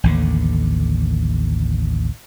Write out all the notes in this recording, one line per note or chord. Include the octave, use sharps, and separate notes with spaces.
A1 D#2 D3